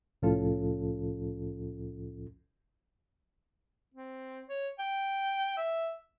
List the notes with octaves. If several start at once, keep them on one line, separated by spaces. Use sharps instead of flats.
C2 A2 F3 C#4 F4 A4
C4
C#5
G5
E5